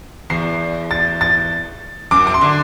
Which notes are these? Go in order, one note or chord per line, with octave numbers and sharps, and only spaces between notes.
E2 C7
A6
A6
F#2 D6
D6
C6
D3